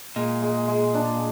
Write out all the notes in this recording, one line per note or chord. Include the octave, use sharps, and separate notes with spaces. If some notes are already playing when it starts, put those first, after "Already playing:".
A#2 G#3
G#3
G#3
D4